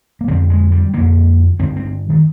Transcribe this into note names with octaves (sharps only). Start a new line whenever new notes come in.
A#3
F2 D3 C4
G#3
G3
F2 D3 A#3
G2 D3 C4
C4
D#3